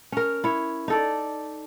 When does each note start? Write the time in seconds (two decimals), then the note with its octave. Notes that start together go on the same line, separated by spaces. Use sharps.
0.12 C#4 A#4
0.44 E4 C#5
0.88 D#4 A4 D5